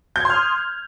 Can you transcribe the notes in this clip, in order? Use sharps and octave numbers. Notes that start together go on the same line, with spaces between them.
C6 D#6 F6 G6 G#6